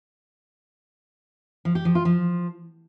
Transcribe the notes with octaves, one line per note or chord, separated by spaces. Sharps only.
F3
G4
F3
F4
F3